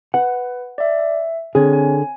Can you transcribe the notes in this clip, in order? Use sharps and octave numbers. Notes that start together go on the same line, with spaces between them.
B4 F#5
D5 E5
E5
D3 C4 G#4 C#5
G#5